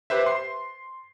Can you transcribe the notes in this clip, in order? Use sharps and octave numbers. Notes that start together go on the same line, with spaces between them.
G4 B4 C5 E5
C6 C7